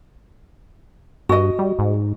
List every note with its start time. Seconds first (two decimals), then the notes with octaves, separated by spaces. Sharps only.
1.29 G2 F#4 D#5
1.59 G3
1.79 G#2